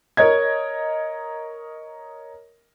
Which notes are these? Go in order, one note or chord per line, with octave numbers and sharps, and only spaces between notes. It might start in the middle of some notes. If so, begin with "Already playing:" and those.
A#4 C#5 D#5 G#6